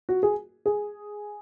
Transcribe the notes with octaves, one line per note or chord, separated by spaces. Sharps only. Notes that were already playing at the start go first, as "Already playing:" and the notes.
F#4
G#4
G#4